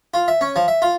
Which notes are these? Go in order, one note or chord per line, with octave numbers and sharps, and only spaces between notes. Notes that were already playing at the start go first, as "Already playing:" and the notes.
F4
E5
C#4
F3
E5
F4